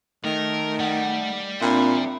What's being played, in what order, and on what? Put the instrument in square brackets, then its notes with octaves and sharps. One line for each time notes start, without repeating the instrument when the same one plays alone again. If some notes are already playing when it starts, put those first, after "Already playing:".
[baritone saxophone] D#3 [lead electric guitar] A3 [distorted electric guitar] A#4
[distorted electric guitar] G3 [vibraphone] F#5
[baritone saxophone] A#2 [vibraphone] C4 D4 B5 [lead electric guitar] E5 G5